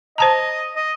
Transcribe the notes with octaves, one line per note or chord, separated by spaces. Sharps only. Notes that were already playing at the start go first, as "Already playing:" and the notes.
C5 D#5 A5 A#5
D#5